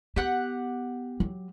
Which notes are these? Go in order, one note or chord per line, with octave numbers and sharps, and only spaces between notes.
B3 G4 F#5 F#6
F#3